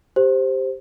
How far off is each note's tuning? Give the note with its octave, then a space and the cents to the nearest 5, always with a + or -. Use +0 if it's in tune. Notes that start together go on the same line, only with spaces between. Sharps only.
G4 +0 C5 +0